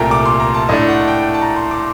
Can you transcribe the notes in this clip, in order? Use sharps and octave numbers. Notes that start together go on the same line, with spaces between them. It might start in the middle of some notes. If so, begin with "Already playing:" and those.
Already playing: C2 A#2 A3 G5 A#5
D6
C6
A#5
A5
A2 A3 D4 D#5
F#5
A5
G5
A5
A#5
C6
D6